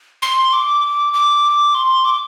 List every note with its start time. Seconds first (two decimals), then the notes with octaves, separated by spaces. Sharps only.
0.22 C6
0.53 D6
1.14 D6
1.75 C6
2.05 D6